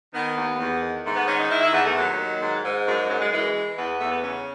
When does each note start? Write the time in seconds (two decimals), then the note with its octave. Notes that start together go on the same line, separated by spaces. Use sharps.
0.14 D#3 B3
0.36 D#2
0.59 E2
0.81 D#3
1.04 G#2 A3
1.15 B3
1.27 D#3 C#4
1.38 D#4
1.50 D#3 E4
1.61 E4
1.73 E2 B3
1.84 A3
1.95 D#2 F#3
2.18 D#3
2.41 G#2
2.64 G#2
2.87 F#2 G#3
3.09 F#2 F#3
3.20 G#3
3.31 E3 G#3
3.55 E3
3.77 E2 B3
3.98 E2 A3
4.10 B3
4.22 C#3 C#4